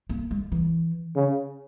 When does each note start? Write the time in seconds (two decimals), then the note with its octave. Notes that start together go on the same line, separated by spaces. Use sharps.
0.09 A#3
0.31 G#3
0.52 E3
1.16 C#3